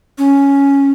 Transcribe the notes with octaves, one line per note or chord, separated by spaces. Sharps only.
C#4